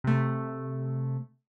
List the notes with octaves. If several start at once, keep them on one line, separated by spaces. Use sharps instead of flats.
C3 A3